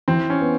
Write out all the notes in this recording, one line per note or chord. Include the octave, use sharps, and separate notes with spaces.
E3 C4
C#4
B3